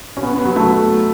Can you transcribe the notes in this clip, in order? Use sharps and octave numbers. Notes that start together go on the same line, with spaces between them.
C#4
B3
B3
F#3
A3